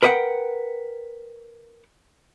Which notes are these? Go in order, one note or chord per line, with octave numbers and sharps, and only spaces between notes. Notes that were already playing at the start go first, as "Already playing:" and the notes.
A#4 B4 D#5 F#5 G5